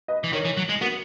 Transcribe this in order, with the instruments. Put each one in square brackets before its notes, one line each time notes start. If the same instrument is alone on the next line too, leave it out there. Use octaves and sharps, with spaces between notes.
[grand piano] B4 D#5
[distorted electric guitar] E3
[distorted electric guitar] D#3 [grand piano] A#4 C#5
[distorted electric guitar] E3
F#3
G#3
[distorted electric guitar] B3 [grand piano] F#4 A#4